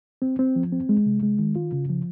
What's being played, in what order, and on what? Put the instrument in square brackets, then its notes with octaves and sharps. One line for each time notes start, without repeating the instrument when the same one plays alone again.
[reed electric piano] C4
C4
F3
C4
G#3
C3
G#3
D#3
F4
C#3
F3